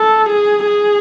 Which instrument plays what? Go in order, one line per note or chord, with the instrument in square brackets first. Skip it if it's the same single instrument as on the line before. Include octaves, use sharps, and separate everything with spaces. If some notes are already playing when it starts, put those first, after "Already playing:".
Already playing: [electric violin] A4
G#4
G#4